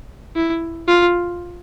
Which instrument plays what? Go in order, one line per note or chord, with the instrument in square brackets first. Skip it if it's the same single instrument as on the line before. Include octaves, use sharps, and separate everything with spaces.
[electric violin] E4
F4